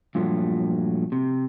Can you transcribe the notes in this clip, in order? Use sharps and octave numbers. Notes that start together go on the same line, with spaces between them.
G2 A#2 F3 F#3 A3
C3